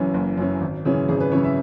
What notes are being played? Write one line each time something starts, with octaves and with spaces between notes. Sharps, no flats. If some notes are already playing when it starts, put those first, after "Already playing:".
Already playing: F#1 F#2 E3 C#4
F#1
F#2 E3 C#4
G#1
F#2 C#3 E3 C#4
G#1 G#4
B4
F#2 C#3 E3 C#4 C#5
E5